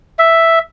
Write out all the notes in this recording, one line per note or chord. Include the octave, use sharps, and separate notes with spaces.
E5